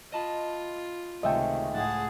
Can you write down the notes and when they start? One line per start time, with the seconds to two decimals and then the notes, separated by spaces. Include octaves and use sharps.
0.12 F4 D#5 A5 B5
1.23 C#2 C3 D#3 A3 D#5 E5 G5
1.74 A2 G#4 F#5 A5